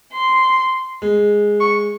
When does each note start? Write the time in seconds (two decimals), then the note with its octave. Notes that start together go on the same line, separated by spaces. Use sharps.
0.13 C6
1.02 G#3
1.60 C#6